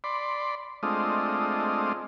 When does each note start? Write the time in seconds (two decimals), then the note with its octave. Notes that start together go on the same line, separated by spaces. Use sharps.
0.04 D5 B5 C6
0.83 G#3 A3 C4 D4 F4 D#5